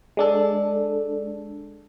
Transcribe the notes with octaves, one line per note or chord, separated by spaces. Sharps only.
G#3 D4 A4